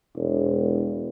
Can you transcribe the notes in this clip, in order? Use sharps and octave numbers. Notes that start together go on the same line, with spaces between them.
E1